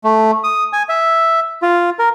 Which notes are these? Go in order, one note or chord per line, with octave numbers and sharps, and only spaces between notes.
A3
D#6
G#5
E5
F4
A#4